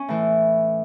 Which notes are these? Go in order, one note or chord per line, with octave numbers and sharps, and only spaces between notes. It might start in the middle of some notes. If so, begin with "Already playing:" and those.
Already playing: C#4
A2 E3